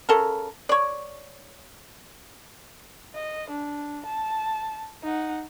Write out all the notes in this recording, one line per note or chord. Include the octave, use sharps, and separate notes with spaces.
C#3 A4 A#4
C#5 D5
D#5
D4
A5
D#4 F#5